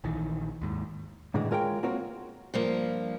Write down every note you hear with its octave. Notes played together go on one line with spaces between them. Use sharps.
A#1 D#3 E3
D#2 G#2
A2 D3 E3 G#3
G#3 F4 A#4 C#5 D#5 G5
A#3 C4 F4 F#4 A#4 C#5
G2 F3 A#3